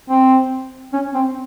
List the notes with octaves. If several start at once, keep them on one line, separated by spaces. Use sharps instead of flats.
C4
C#4
C4